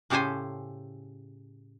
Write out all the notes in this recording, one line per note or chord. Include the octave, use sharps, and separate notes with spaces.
A2 C#3 G4 A4 C5 G#5